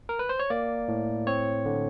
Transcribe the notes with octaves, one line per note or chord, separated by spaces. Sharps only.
A#4
B4
C5
C#5
A#3 D5
A2
C4 C#5
D3